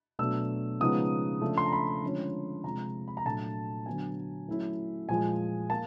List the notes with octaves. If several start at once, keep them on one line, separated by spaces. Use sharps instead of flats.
B2 F#3 A3 D4 E6
C#3 F3 G#3 B3 D#4 D#6
C#3 F3 A3 D4
C6
A#5
B5
D3 F3 G#3 C#4
C3 F3 G#3 A#5
B5
A#5
A#2 F#3 A3 D4 A5
D3 F#3 B3 G#5
F#3 A3 C#4 E4
A#2 F3 G#3 G#5
A#3 A5